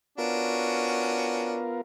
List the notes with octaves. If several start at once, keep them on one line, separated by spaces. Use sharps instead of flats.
B3 C#4 D4 F4 F#4 A#4